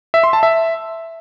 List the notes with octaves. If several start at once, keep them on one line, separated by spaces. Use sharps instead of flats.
E5
C6
A5
E5